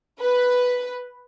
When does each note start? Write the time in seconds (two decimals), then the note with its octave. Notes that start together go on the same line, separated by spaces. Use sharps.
0.20 B4